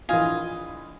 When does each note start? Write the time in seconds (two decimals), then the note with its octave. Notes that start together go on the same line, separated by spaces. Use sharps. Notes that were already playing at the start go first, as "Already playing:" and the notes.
0.09 A#1 E3 F4 D#5 F5 G#5